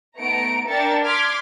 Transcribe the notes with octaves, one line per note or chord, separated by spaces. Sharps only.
A3 B3 D#4 A#5 C#7 D7
D4 A#4 E5 G5 A6 C#7
C6 D6 F6 G#6 B6